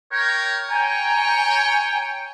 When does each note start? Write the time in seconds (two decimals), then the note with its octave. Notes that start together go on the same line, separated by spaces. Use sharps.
0.12 A#4 C#5 G5
0.70 C#5 G5 G#5 A#5